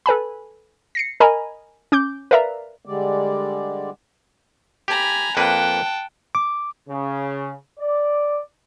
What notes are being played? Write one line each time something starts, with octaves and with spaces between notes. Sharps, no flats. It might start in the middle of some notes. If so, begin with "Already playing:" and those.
A4 B4 G#5 B5
A#6 C7 C#7
A#4 D#5 G#5 A#5 B5
C#4 D6 G6
A#4 B4 D5 E5 F5 A#5
D3 G3 G#3 D5
G4 G#5 A#5 B5
F2 A#3 B4 F#5 G5 A5
D6
C#3
D5